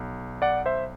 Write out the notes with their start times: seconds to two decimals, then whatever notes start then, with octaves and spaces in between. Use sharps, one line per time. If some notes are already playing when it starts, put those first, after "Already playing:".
Already playing: B1
0.42 D5 F#5
0.66 C5 E5